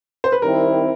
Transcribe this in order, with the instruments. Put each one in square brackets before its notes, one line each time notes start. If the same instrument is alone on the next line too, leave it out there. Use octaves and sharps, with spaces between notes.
[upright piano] C5
B4
[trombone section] D#3 G3 C4 E4 [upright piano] A#4